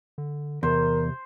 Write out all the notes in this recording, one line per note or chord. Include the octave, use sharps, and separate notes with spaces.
D3
E2 C3 A#4 C5